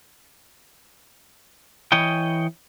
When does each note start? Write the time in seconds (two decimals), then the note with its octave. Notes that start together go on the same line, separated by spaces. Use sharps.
1.92 E3 C#5 D#5 G5